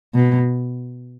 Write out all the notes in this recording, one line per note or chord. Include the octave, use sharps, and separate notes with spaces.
B2